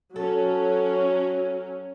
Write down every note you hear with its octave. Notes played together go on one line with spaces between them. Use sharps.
F#3 C#4 A4